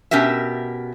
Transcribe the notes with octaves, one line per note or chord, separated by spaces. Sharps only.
B2 C#4 G4 A#4 E5